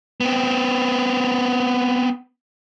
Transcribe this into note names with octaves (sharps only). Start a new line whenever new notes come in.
B3 C4